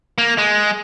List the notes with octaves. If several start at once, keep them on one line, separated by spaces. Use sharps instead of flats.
A#3
G#3